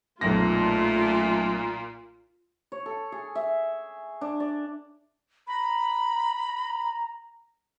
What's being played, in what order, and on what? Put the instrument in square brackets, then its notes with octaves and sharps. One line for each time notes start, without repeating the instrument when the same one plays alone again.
[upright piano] B1 F#2 A#6 [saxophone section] A#2 [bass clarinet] A3 [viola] F4
[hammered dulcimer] C#5
A4
G#4
E5
D4
D5
[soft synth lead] A#5 [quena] B5